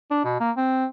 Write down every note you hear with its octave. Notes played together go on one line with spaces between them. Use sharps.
D4
B2
A#3
C4